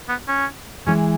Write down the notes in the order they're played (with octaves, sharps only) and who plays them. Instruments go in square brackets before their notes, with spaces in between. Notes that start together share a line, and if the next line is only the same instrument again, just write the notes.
[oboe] B3
C#4
[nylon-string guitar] E3 G#3 [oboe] C#4